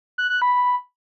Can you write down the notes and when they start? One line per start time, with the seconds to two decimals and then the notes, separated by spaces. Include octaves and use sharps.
0.18 F#6
0.30 F#6
0.42 B5